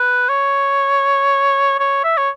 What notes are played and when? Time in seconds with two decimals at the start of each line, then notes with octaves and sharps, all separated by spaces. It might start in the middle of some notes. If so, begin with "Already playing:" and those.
Already playing: B4
0.29 C#5
1.79 C#5
2.04 E5
2.18 C#5